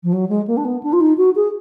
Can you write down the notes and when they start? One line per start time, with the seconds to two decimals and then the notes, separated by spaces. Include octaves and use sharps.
0.04 F3
0.13 F#3
0.29 G#3
0.47 A#3
0.57 D4
0.65 B3
0.83 D4
0.93 F4
1.01 D#4
1.18 F#4
1.36 G#4